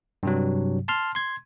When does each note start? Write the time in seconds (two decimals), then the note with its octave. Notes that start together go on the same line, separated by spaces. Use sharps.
0.23 G2 C3 F#3
0.88 A5 C6 F6
1.15 C6 G#6